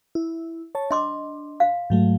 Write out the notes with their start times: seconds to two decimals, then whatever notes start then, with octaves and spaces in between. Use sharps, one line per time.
0.15 E4
0.75 C#5 A5
0.91 D4 D#5 C6 D6
1.60 F5
1.90 G#2 F#3 A3